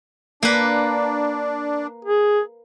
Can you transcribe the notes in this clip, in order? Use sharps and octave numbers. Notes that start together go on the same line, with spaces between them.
A#3 D4 B4
G#4